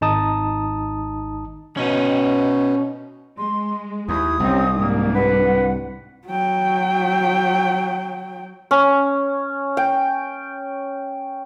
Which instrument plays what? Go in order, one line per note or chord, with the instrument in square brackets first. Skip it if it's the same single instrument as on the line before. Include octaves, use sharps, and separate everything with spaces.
[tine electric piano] G#1 D#4 A5 D#6
[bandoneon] B2 [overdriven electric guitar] C#4 D#4
[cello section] G#3 [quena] C6
[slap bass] D#2 [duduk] E4 [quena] D#6
[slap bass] C2 [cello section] G3 C#4 D#4 [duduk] C4
[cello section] G#2 G3 D4 [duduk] A#3
[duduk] B4 [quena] F#5
[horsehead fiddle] F#3 G5
[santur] C#4
G5